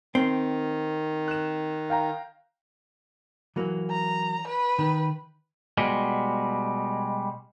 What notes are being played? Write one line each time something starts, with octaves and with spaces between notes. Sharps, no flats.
D#3 C4
F#6 E7
F5 G5 A#5
E3 F#3 A#3
A#5
B4
D#3
B2 G3 G#3